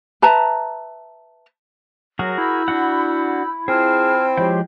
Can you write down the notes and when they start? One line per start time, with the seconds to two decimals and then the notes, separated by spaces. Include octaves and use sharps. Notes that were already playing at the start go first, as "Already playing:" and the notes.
0.22 B4 E5 A5 A#5
2.19 F#3 F#4 G#4 A#4
2.38 E4 B5 E6 G6
2.68 D4 F#4 F#5
3.68 C4 F4 G#4 A5 F6
4.37 F3 G#3 G4 C5 C#5 G5